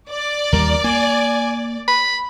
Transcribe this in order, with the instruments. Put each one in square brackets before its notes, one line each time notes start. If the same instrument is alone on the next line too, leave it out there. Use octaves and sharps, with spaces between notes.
[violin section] D5
[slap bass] D#2 G3 [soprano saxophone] A#4
[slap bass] A#3 [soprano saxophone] G#5
[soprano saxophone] B5